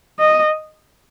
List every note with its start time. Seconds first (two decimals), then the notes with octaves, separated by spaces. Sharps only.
0.19 D#5